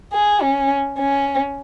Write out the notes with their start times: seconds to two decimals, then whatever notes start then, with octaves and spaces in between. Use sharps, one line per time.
0.13 G#4
0.42 C#4
0.99 C#4